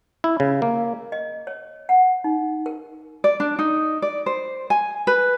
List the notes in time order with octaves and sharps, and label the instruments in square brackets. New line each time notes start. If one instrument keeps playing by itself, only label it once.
[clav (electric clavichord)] E4
C#3
A#3
[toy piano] D#5
C#5
F#5
D#4
A#4
[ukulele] D5
D4
D#4
D5
C5
G#5
B4